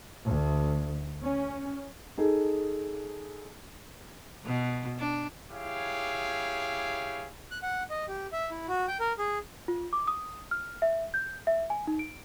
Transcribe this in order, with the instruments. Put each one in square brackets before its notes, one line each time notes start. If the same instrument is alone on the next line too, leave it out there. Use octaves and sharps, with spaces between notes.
[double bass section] D2
C#4
[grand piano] D#4 G#4 A4
[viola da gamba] B2
D4
[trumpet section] E4 G4 G#4 C#5 F5
[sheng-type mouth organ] F#6
F#5
D#5
G4
E5
E4
F#4
G5
A#4
G#4
[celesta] F4
D6
D#6
F6
E5
G6
E5
G#5
D#4
D7